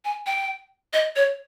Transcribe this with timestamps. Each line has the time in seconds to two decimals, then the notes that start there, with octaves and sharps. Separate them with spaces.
0.05 G#5
0.26 G5
0.93 D#5
1.16 C#5